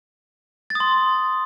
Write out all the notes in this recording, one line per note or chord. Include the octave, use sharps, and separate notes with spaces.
A6
D#6
C6